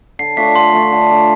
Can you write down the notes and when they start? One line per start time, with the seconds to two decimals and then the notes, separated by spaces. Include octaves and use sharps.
0.19 D3 C7
0.37 A3 D4 F4 B6
0.55 D3 C6
0.73 A3 D4 F4
0.92 D3
1.09 A3 D4 F4